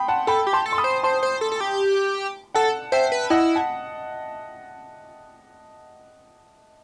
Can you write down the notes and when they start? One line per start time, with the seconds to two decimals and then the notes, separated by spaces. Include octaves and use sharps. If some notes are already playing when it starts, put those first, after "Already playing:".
Already playing: G5 B5 C6 D#6
0.08 F#5 A5
0.27 A4 G5 B5
0.47 G4
0.53 A5 C6
0.66 A4
0.72 C6
0.78 B5 D#6
0.84 C5
1.03 C5 A5 C6
1.23 C5
1.41 A4
1.52 A4
1.60 G4
2.55 A4 F#5 A5
2.92 C5 E5 G5
3.12 B4
3.30 E4 D#5 F#5
3.56 F#5 A5